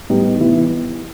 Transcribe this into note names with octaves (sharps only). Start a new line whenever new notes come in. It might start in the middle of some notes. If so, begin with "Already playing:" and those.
A2 G3 B3 D#4 G4
C3 E3 B3 E4